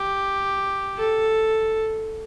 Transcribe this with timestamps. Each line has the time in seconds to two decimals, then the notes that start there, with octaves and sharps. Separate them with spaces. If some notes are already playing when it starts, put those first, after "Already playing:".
Already playing: G4
0.97 A4